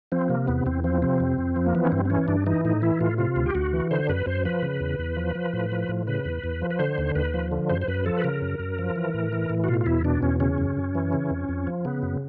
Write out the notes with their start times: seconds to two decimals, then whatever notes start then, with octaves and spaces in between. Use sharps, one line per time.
0.12 F3 C4
0.29 C3 A#3
0.47 E2 B3
0.66 E2 C4
0.84 F3 C4
1.02 C3 C4
1.20 F2
1.38 F2
1.56 F3
1.66 A#3
1.75 E3 B3
1.85 C#4
1.92 G2 C4
2.05 C4
2.10 E3 C#4
2.28 G2 D4
2.46 E3 D#4
2.65 A2 D#4
2.82 E3 E4
3.01 A2 F4
3.18 C3 F4
3.36 D2
3.46 G4
3.55 D2 F#4
3.73 E3
3.91 D3 C5
4.09 F#2 B4
4.26 F#2 C5
4.45 F3 B4
4.62 C#3
4.80 E2
4.99 E2
5.17 F3
5.35 F3
5.53 A2
5.72 F3
5.89 A2
6.07 C#3 B4
6.25 E2
6.44 E2
6.62 F3
6.71 B4
6.79 D3 C5
6.98 D#2
7.15 D#2 B4
7.34 F3
7.52 D3
7.70 F#2 C5
7.81 C5
7.88 F#2 B4
8.06 F3 A4
8.17 B4
8.24 C#3 A#4
8.42 F#2
8.59 F#2
8.79 F3
8.96 E3
9.14 A2
9.33 E3
9.50 A2
9.64 F#4
9.68 B2 F4
9.81 F4
9.86 E2 E4
10.04 B2 D4
10.22 E2 C#4
10.40 C#3 C#4
10.58 F#2
10.77 F#2
10.95 E3
11.13 C#3
11.30 F2
11.49 F2
11.67 F3
11.85 C#3 B3
12.02 F#2